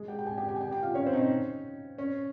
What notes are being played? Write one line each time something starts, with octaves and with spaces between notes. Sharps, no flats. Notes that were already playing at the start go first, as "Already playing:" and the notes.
Already playing: G#3 G#4
G4 G5
G5
G#4 G#5
G4 G5
G4 G5
G#5
G4 G5
G4 G5
F4 F5
C#4 C#5
C4 C5
D#4
C#4
C#4